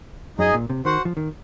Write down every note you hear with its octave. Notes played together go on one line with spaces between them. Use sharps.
F#2 D#4 G#4 D#5 G#5
A#2
C3
D#3 F#4 C5 F#5
F3
D#3